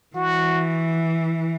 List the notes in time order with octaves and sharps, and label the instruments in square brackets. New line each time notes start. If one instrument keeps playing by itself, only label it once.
[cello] E3 [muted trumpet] F#4